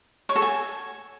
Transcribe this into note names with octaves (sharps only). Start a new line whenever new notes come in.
C#5
A4
G#5